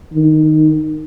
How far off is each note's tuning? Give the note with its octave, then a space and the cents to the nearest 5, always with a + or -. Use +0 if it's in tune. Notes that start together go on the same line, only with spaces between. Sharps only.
D#3 -5